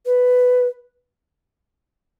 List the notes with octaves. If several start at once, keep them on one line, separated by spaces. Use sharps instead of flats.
B4